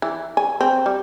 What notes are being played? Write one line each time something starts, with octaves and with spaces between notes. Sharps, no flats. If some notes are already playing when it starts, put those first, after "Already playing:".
E3
G#5
C4
G3